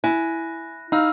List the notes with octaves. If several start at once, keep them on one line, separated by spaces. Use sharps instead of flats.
E4 G#5 F#6 A#6
D#4 F5 B5 E6 F6